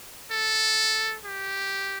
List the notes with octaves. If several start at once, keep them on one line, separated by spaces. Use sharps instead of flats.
A4
G4